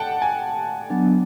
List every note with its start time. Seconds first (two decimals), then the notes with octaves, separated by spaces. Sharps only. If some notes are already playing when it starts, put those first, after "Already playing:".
Already playing: F#5 G5 A5
0.22 G#5
0.90 F#3 B3 D4